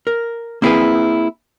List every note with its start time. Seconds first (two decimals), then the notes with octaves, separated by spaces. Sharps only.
0.07 A#4
0.62 A#3 C4 E4 G4 G#4 B4